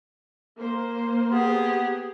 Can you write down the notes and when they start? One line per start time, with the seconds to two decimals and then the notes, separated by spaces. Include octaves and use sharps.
0.57 A#3 C5
1.31 B3 G4 G#4